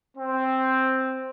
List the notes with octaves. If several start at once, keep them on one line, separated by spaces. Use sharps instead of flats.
C4